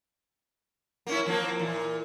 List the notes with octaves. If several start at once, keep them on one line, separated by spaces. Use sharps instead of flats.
A#3 C#4 E4
F3 A#3 C4
A#2 E3